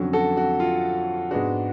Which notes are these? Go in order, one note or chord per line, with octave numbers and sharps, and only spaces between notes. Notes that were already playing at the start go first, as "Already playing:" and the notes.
Already playing: F2 D3 F#3 C#4
F#4 A4
F#4
F4
G#2 G#3 B3 D4 F#4